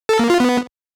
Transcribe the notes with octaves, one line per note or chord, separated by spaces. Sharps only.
A4
A#3
F4
B3